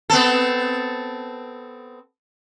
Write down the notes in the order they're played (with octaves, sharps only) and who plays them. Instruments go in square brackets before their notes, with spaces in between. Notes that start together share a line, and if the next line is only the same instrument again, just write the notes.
[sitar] B3 C4 A4